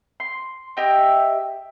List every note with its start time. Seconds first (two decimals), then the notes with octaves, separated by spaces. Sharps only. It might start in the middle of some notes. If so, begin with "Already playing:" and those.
0.20 C6
0.77 G4 D#5 E5 G5